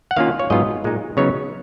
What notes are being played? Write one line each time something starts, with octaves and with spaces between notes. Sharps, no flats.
F#5
D#3 A#3 C#4 F4 F5
C#5
G#2 F#3 B3 F4 D#5
A#2 G#3 D#4
C#3 F#3 B3 D#4 C#5